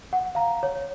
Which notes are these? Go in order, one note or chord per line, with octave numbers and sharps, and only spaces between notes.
F#5
F5 A#5
C#5